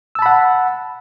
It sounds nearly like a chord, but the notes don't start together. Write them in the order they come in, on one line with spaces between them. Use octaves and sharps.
E6 A5 B5 F#5